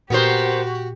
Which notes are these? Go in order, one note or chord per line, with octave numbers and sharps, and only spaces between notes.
A#2 B3 F#4 G4 A#4 C5